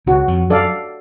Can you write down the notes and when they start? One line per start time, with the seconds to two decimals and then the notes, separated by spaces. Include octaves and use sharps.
0.06 C#2 C#3 F#4
0.28 F2 F3
0.50 F#2 F#3 A4 D5 F5